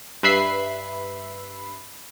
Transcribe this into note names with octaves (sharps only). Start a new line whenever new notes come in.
G2 B4 E5 B5 C7